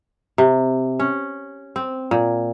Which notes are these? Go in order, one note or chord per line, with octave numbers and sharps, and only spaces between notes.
C3
C#4
C4
A#2